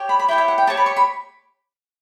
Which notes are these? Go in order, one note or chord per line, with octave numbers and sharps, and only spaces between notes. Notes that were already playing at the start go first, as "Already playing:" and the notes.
Already playing: G4 C#5
B5
B5
E4 G4 C#5 G5
E5
F#5
G5
G4 C#5 A5
B5
C#6
B5